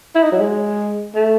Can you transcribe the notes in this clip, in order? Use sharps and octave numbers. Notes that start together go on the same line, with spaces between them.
E4
D#4
F#3
G#3
A3